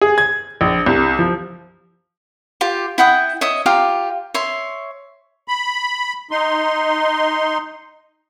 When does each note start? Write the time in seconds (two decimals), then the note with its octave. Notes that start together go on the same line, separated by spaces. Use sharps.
0.01 G#4
0.18 G#6
0.61 A#1
0.86 C2
1.19 F3
2.61 F4 G4
2.98 E4 F#5 G5 D#6
3.41 C#5 D#5 E5 D#6
3.66 F4 G4 F5 A#5
4.34 C#5 E5 C6
5.48 B5
6.31 D#4 C6